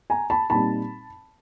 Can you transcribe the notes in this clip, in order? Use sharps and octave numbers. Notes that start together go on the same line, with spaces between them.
G#5 A#5
A5 B5
A#2 G3 C4 D#4 A5 B5